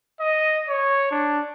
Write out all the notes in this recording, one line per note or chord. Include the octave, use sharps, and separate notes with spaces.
D#5
C#5
D4